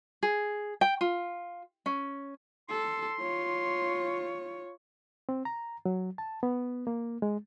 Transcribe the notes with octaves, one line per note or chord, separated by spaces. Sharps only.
G#4
G5
F4
C#4
A4 C6
F4 C#5
C4
A#5
F#3
A5
B3
A#3
G#3